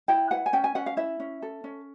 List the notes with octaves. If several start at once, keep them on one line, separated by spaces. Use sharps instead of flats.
E4 G5
B4 F#5
G#5
C#4 G5
G#5
C#4 F#5
F5
E4 E5
C#4
A4
C#4